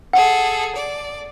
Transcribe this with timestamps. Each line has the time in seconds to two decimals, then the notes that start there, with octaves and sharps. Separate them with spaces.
0.13 G#4 A4 F#5
0.75 D5